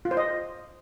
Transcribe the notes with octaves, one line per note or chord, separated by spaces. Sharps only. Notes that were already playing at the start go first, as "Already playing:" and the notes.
F4
C5
D#5